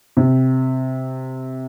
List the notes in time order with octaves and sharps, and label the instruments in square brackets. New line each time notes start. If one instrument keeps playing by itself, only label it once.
[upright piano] C3